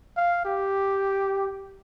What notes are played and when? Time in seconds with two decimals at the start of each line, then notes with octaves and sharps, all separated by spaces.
0.17 F5
0.45 G4